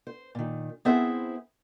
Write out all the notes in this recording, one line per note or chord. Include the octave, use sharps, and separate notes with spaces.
C5
A#2 D#3
B3 C4 E4 G#4 C5 E5